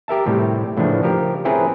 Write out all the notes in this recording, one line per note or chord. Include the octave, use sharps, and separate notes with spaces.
G4 A#4 E5 A5
A2 C3 G3
A2 C#3 E3 F3 D4
F3 G4 A#4
C4 C#4 E4 G#4 A#4 B4